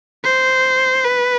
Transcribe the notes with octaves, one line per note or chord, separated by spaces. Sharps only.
C5
B4